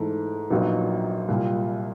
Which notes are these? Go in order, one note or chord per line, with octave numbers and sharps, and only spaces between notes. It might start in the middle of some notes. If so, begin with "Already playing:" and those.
Already playing: G#2 E3 A3
A#1 A#2 F#3 B3 D#4
C2 A#2 G3